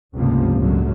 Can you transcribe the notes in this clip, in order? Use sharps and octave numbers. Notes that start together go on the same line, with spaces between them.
F1 C#2 G2 C3 F3 A#3
C#2 F#2 A2 D3 F#3